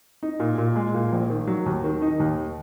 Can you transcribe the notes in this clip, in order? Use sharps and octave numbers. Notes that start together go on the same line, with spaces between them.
D#4
A#2
A#2
G#3
A#2
A#1
D#3
F#3
D#2
D#3
D#4
D#2